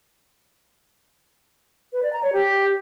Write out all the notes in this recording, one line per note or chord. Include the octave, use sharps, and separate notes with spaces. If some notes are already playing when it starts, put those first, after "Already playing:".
B4
D5
A#5
C#5
G4